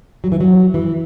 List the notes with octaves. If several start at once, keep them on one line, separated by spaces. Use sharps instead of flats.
F#3
E3
F#3
E3